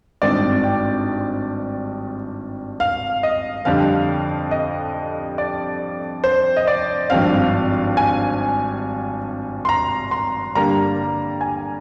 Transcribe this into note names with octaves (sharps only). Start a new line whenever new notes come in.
G#1 G2 D#3 G#3 C4 D5
G5
F5
D#5
F2 D3 G3 C4 F5
D#5
D5
C5
D#5
D5
G#1 G2 F3 C4 F5
G#5
C6
A#5
C6
G2 D3 G3 A#3 A#5
G#5